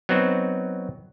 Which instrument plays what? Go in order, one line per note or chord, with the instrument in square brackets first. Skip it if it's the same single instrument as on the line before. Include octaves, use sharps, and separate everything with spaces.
[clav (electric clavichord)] F#3 B3 C4 D#4 F#4